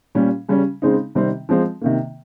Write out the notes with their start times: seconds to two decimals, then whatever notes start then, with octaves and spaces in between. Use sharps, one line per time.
0.15 A#2 G3 C#4
0.48 C#3 G3 C#4
0.82 C#3 G#3 C4 D#4
1.15 C3 D#3 G3 C4
1.49 F3 G#3 C4
1.82 C3 D#3 A#3